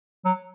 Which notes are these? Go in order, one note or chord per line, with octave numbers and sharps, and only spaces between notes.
F#3